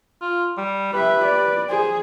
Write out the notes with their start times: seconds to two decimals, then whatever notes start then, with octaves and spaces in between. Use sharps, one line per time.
0.21 F4
0.58 G3
0.93 G4 B4 E5
1.25 D5
1.70 G#4 C5